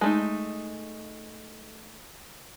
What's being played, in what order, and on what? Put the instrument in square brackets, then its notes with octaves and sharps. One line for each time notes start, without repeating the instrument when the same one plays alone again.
[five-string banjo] G#3 A3 D#4